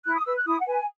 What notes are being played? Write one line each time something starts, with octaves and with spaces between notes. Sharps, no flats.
E4 F#6
D#6
B4 E6
F#6
E4 D#6
F#5
B4 G#5